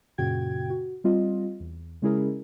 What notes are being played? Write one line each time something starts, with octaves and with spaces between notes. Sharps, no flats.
F#2 A#2 C#3 F#4 G5 G#6
F#4
G3 C4 F4 D#5
E2
C#3 G#3 C#4 E4 G#4 A#4